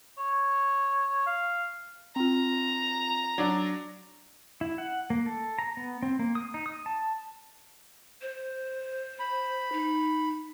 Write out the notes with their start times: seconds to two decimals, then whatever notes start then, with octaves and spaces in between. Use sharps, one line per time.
0.18 C#5
1.26 F5
2.16 C4 F4 A#5
3.38 F#3 D4 D5
4.61 E4
4.78 F#5
5.10 A#3
5.26 A4
5.59 A#5
5.77 B3
6.02 C4
6.19 A#3
6.35 D#6
6.54 D#4
6.66 D#6
6.86 A5
8.22 C5
9.19 B5
9.72 D#4